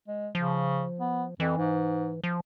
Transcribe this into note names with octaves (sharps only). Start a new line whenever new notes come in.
G#3
C#3 F3
B3
F2 E3
G#2
F3